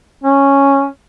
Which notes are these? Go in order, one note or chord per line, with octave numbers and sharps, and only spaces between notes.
C#4